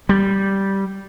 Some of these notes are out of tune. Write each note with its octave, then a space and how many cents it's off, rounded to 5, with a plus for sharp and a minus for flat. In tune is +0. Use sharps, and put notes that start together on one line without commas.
G3 -5